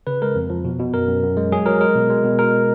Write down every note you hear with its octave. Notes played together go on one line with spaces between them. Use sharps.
C#3 B4
G#3 A#4
F2
F3
B2
B2
F#2 A#4
F#2
F#2
G#3
F#3 G#4
F#3 A#4
G#3 A#4
B2
G#3
B2
G#3 A#4